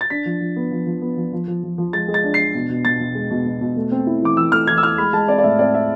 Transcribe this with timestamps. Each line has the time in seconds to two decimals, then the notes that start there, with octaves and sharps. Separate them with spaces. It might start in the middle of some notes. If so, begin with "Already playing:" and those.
0.01 A6
0.10 D4 B6
0.26 F3
0.40 F3
0.56 B3
0.71 F3
0.87 F3
1.02 B3
1.17 F3
1.33 F3
1.47 F3
1.63 F3
1.78 F3
1.93 G#3 A6
2.08 G#3
2.14 A6
2.24 D4
2.34 C7
2.39 D4
2.54 B2
2.69 B2
2.85 B2 A6
3.00 B2
3.15 G#3
3.30 B2
3.45 B2
3.61 B2
3.76 A3
3.91 C4
4.07 E4
4.22 E3 D6
4.37 E3 E6
4.52 A3 F6
4.67 E3 G#6
4.77 E6
4.83 E4 F6
4.98 G#3 B5
5.13 G#3 A5
5.28 C4 D5
5.38 D5
5.44 A2 E5
5.59 C4 D5
5.74 C4 E5